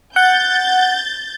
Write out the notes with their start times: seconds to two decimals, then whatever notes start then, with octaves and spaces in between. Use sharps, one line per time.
0.16 F#5 G6 A6